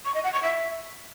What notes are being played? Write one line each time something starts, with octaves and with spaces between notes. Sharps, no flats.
C#6
D#5
F#5
C#6
E5